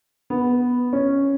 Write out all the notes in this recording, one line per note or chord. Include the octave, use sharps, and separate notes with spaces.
B3
C#4